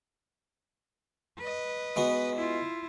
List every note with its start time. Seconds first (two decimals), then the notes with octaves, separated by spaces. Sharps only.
1.39 B4 D#5
1.96 G#3 B3 F#4
2.36 E4 F4